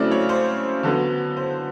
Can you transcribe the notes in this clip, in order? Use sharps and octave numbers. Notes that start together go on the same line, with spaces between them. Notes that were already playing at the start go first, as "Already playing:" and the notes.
Already playing: C#3 F#3 A3 C4 E4 D5
C#5
C5
D3 F#3 B3
C5